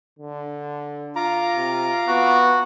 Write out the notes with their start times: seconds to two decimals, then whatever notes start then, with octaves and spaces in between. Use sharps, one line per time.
0.19 D3
1.16 F4 A#5 D6
1.56 C3
2.08 B3 F#4